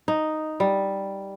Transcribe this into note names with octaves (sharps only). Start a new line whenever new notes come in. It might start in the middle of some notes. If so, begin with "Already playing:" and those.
D#4
G3